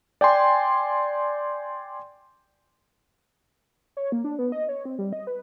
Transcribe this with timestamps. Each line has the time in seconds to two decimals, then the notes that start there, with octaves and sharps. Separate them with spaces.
0.21 D5 G5 G#5 C6
3.97 C#5
4.12 A#3
4.24 D4
4.39 B3
4.52 D#5
4.69 C#5
4.85 C4
4.99 G3
5.13 D#5
5.27 B4